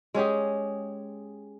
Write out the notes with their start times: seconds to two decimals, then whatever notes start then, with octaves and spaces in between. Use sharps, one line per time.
0.14 G#3 C#4 G4 G#4